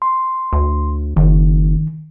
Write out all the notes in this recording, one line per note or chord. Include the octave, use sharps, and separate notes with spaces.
C6
D2
F#1 D#3